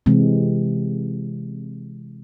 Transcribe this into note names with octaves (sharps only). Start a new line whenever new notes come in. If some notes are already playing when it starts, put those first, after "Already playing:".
C3 E3 G#3 C4